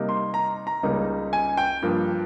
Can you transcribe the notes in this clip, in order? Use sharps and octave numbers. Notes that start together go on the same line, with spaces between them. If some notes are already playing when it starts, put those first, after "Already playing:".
Already playing: C3 G3 A#3 D#4
C6
A#5
A#5
C#2 C#3 G3 A#3 D#4
G#5
G5
G2 F3 A#3